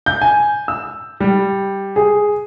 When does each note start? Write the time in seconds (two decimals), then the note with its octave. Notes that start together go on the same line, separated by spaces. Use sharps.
0.06 G6
0.22 G#5
0.68 E6
1.20 G3
1.96 G#4